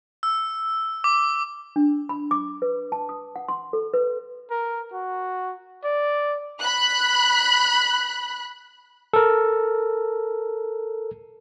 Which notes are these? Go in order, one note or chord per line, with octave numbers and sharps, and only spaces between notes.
E6
D6
D4
B5
D6
B4
A5
D#6
F#5
C6
A4
B4
A#4
F#4
D5
B5 F#6
A4 A#4